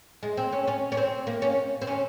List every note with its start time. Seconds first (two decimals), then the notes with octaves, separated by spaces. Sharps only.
0.23 G#3
0.37 C4
0.53 C#4
0.68 C#4
0.92 C#4
0.97 C4
1.27 A#3
1.42 C#4
1.82 C4
1.87 C#4